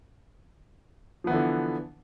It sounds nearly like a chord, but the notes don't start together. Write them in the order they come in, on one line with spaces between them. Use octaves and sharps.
F3 B3 E3 D3